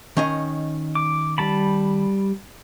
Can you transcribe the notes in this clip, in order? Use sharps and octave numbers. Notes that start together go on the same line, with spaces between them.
D#3 C#4 D#5
D6
G3 A5 B5